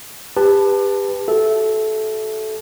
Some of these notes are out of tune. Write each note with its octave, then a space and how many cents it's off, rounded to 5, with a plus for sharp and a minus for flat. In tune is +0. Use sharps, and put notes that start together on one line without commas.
G4 +30 B4 +0 A5 +0
F#4 +30 A4 -20 E5 +0